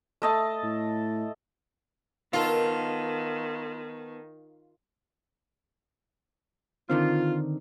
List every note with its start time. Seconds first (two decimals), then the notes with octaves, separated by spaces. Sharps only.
0.22 A3 D#5 A5
0.63 A2
2.33 D#3 B3 D#4 F4 A4 A#4
6.90 D3 D#3 C4 F4